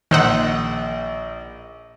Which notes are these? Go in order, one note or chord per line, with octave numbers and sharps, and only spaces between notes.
A#1 D#3 C5 D#5 F#5 E6